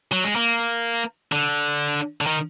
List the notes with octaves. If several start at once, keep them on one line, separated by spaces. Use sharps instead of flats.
F#3
G#3
A#3
D3
D3
D#3